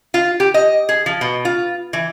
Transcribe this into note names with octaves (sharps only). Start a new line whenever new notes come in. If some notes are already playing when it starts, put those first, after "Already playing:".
F4
G4
D#5
G#4
F3
B2
F4
E3